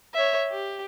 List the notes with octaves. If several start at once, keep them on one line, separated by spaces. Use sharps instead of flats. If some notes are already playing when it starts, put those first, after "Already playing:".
C#5 E5
G4